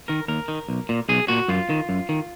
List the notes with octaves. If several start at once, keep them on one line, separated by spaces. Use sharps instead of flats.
D#3 A#4
D#2 A#4
D#3
B1
A#2
B1 G#4
A#2 F#4
F#2 F4
D#3
F#2
D#3